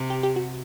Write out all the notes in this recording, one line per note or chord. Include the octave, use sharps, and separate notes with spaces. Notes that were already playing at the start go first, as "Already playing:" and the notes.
Already playing: C3
G4
G4
F#4